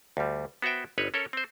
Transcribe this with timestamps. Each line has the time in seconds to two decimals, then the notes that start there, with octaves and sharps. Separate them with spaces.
0.17 D2 G3
0.62 B3 F#4 C5 E5 G5
0.98 G1 D#4 B4 C#5
1.14 C#4 A4 A#4 C#5
1.33 C4 C5